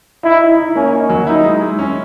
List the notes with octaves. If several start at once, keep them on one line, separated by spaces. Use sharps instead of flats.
D#4 E4
D#4
D#4
A#3 C#4
D#4
F#3
D#4 E4
G#3
G#3
C#4